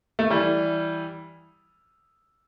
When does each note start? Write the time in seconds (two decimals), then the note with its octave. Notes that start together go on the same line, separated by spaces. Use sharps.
0.19 A3
0.30 E3 G3